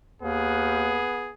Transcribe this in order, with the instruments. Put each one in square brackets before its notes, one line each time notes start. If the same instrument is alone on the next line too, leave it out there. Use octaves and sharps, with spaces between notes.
[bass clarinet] D#2 [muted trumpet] B3 [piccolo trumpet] G#4